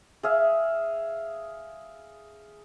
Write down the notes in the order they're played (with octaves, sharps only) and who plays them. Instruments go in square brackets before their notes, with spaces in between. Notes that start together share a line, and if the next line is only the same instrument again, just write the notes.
[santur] G#4 E5 F5